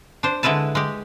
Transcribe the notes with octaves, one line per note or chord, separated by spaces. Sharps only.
D4 C5
D3 G#3 E4 B4 A5
G#3 G4